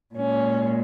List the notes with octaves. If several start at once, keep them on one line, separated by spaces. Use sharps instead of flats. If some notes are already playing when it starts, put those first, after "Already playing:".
A#2 G#3 C#4